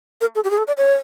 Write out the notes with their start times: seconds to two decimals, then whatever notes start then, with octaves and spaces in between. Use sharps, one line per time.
0.21 A#4
0.35 A4
0.44 G4
0.50 G#4
0.58 A4
0.67 D5
0.77 C#5